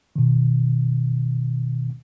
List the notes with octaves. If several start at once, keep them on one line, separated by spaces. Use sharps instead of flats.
B2 D#3